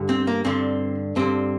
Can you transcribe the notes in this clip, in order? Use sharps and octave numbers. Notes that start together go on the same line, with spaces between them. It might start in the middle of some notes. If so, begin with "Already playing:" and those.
Already playing: G2 D3
C4
A#3
G2 D3 C4
G2 D3 C4